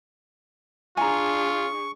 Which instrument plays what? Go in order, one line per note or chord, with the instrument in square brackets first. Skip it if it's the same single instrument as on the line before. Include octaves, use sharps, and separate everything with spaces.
[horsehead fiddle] D4 G#4 [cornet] F4 [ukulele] G#5 A#5 [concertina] C#6